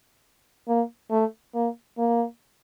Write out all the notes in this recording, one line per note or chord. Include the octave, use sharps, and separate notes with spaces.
A#3
A3
A#3
A#3